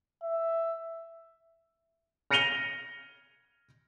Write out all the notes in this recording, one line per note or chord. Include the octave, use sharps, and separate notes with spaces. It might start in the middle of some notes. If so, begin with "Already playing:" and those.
E5
F6 A#6 C#7 D#7 F7 G7